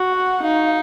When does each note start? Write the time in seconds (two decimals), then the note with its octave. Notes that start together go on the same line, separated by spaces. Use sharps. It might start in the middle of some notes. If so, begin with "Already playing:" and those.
Already playing: F#4
0.14 F#5
0.43 D#4 F5